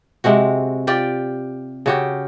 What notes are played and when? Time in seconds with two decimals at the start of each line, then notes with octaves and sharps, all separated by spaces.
0.24 C3 G#3 C4 F#4
0.87 F4 G4 D5
1.86 C#3 F#4 G4